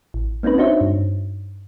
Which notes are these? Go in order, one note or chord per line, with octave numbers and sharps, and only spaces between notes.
A1
A#3 C4 C#4 D#4 B4
D4 D#4 F#4 C5 C#5 E5
G2